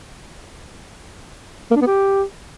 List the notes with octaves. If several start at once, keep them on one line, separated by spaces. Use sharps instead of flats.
A#3
D4
B3
G4